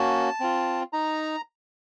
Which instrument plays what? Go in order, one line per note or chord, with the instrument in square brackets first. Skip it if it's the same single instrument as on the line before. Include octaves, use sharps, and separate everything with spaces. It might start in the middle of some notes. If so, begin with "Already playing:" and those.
Already playing: [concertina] A#3 C#4 F#4 A5
C4 F4
D#4 A#5